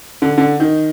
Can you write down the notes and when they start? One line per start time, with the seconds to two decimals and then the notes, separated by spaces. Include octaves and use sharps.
0.22 D3
0.38 D3
0.60 D#3